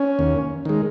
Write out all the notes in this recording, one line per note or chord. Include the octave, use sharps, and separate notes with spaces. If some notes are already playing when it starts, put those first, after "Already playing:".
Already playing: C#4
D#2
D#3 G#3